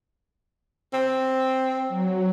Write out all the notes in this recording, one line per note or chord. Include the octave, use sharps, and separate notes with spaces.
C4
F#3